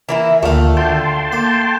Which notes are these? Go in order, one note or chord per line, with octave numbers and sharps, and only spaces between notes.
E3 A#3 E4
D2 A#2 D#3 A3 F5
D2 G5 A5 C6
A#3